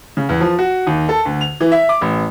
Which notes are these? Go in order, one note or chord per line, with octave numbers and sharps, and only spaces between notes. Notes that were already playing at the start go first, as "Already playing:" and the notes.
C#3
E2
F3
F#4
D#2
A4
D2
F7
E3
E5
D6
A1